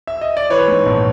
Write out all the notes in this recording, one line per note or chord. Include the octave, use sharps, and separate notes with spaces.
E5
D#5
D5
E3 B4 C#5
G#2
A#1